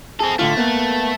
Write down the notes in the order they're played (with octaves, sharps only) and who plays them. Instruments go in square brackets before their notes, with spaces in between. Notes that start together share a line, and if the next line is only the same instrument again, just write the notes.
[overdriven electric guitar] C4 A4 [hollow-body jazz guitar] G#4
[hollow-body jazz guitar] A2 D3 F4 [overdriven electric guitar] A3
[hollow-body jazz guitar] A#3 B3